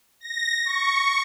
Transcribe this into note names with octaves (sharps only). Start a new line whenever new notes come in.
A#6
C#6